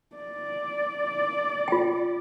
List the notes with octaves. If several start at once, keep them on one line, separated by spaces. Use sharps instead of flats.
D5
F4 G5